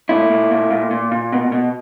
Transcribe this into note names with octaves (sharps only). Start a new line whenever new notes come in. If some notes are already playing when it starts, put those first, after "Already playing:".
A#2 E4
A#2
A#2
A#2
A#2
A#2
B2
B2